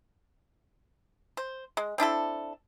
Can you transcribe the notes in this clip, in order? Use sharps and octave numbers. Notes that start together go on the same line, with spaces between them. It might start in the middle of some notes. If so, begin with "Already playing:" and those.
C5
G#3
C4 D4 E4 A4